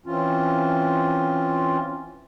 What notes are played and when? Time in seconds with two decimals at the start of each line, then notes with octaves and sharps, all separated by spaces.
0.06 E3 C4 C#4 F4